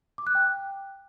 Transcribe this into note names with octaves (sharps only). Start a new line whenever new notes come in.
D6
F#6
G5